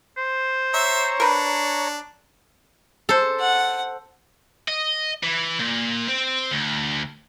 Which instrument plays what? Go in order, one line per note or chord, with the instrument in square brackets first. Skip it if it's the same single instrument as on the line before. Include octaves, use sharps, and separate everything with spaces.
[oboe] C5
[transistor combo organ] C#5 A#5 [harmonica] E5
[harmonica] D4 [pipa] A#4 B4
[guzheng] A4 C5
[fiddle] F#5
[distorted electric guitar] D#5
E3
A#2
C4
D2